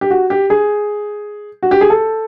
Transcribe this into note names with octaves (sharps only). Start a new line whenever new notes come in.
G4
F#4
G4
G#4
F#4
G4
G#4
A4